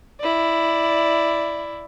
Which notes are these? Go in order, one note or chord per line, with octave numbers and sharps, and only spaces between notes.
E4 D5